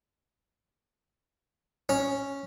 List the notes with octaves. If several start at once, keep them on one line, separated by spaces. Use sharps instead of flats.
C#4